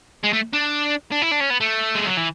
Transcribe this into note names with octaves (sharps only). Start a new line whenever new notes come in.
G#3
A3
D4
D4
E4
D4
C#4
B3
A3
G#3
F#3
E3